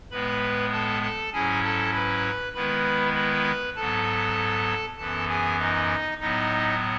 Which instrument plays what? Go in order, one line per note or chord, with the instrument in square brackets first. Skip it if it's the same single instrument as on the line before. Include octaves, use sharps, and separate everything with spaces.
[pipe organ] A2 G#3 B3 B4 B5
A4 A5
A4 A5
G#2 F#3 C#4 E4 G#4 G#5
A4 A5
B4 B5
D#3 G#3 B3 E4 B4 B5
B4 B5
G#2 F#3 B3 A4 A5
F#2 E3 B3 A4 A5
G#4 G#5
D#4 D#5
A2 F#3 B3 D#4 D#5